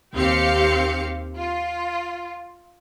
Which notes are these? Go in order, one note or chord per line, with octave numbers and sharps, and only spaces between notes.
D#2 C4 G4 F5 C#7
F4